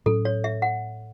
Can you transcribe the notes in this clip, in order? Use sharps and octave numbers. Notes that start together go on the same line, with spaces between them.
A2 F#3 C#4 A4
C#5
E5
F#5